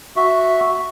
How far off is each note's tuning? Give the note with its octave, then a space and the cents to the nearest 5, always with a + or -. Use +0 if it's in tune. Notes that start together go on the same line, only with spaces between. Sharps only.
F#4 +0 E5 +0